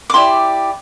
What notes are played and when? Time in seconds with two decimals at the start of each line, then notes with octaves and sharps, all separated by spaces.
0.10 D6
0.14 E4 G4 D5 C6